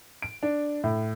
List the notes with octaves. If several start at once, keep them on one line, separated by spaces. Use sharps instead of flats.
D7
D4
A2